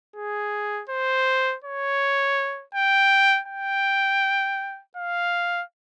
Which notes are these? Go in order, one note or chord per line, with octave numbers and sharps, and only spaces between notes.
G#4
C5
C#5
G5
G5
F5